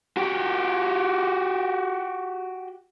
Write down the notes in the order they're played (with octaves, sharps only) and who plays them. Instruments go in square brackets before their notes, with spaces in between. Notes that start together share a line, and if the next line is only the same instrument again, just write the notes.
[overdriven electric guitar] F#4 G4